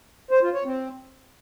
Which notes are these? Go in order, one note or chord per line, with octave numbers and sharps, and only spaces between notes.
C5
F4
C#5
C4